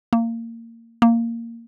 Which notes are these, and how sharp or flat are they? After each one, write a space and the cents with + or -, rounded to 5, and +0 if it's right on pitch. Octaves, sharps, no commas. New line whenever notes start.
A#3 -25
A#3 -10